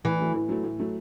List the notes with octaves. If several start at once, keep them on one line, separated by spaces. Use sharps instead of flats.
A2 E3
F#3 A3
A2
F#3 A3
A2
F#3 A3